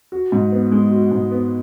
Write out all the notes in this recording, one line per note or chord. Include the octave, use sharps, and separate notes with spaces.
F#4
G#2
B3
G#3
F#4
G#2
B3